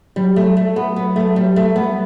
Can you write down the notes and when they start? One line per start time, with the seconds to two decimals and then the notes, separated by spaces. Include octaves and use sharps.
0.16 F#3 G3
0.36 A3
0.57 A3
0.76 B3
0.96 B3
1.16 A3
1.36 G3
1.56 A3
1.76 G3 B3